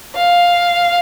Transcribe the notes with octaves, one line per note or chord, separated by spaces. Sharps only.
F5